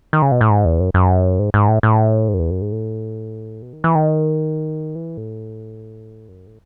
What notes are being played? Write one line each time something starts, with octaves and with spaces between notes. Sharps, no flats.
D#3
C#3
B2
A2
G#2
E2
F#2
F#2
G#2
G#2
A2
A2
G#2
F#2
E2
F#2
G#2
A2
B2
D#3
E3
D#3
E3
A2
F#2
A2